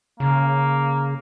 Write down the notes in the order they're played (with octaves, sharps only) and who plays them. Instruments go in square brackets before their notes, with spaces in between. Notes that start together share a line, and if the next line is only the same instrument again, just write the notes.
[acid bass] C#3 [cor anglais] A#3